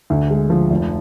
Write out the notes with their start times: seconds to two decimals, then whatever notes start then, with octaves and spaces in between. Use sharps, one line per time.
0.10 D2
0.30 G#3
0.50 F3
0.70 F1